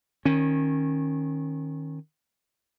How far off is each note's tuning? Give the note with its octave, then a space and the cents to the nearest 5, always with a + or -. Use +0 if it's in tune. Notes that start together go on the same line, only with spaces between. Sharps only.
D#3 -5 C#4 -25